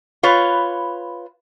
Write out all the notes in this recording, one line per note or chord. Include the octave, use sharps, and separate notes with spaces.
F4 B4 C#5